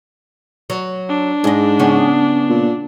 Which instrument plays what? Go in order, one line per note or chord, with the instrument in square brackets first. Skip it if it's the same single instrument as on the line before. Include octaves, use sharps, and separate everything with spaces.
[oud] F#3
[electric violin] D4
[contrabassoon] G#2 [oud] G#4 D#5
[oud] C#3 B3 C#4
[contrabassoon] A#2